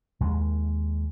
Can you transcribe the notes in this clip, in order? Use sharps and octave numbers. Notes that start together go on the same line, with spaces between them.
D#2 G#3